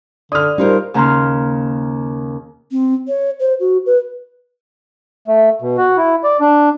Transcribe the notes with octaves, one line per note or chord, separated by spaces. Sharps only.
D3 D5 D#6 F6
G3 D#4 F4 A#4 C5
D#2 C#3 A#3 A#5 C6 F6
C4
C#5
C5
F#4
B4
A3
B2
F#4
E4
D5
D4